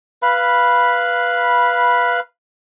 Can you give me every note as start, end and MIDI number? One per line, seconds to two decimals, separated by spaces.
0.22 2.20 71
0.22 2.20 77
0.22 2.20 83